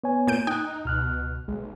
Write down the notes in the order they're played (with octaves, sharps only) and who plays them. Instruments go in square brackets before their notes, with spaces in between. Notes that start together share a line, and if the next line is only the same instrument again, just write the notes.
[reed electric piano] B3 C#5 G#5
[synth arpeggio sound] A#2 G6 D7
[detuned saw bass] D#4 [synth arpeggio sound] G5 [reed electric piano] D#6 F#6
[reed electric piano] C#2 F6 F#6 [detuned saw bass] B2
[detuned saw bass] B1 [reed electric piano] G#3